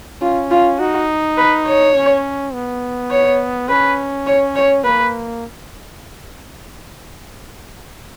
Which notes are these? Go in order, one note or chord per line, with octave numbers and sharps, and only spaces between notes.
C#4 F4
F4
D#4 F#4
B4
C#5
C#4
B3
C#5
C#4 B4
C#5
C#5
A#3 B4